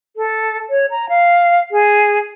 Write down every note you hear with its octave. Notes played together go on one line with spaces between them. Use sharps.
A4
C#5
A#5
F5
G#4